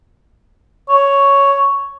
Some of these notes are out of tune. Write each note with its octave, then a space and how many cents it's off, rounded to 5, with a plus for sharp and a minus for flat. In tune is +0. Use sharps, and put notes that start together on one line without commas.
C#5 +5